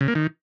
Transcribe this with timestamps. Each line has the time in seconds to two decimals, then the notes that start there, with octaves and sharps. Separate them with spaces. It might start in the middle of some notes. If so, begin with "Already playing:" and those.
0.01 C#3
0.08 A#3
0.15 D#3